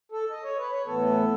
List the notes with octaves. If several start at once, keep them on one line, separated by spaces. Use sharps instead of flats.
A4
D#5
C#5
B4
C#5
A2 E3 B3 A4